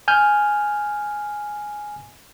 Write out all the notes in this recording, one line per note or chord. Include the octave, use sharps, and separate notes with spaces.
G#5 F6 G6